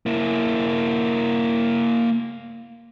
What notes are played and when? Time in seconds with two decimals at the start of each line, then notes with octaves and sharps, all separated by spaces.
0.06 A#3 E4